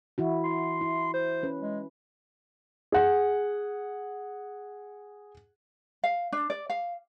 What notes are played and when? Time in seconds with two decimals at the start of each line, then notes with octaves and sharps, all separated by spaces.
0.18 E3 E4 F#4
0.44 C6
0.81 E4
1.14 C5
1.43 C#4 B4
1.60 G#3
2.92 G#4 F#5
6.04 F5
6.32 D4
6.50 D5
6.70 F5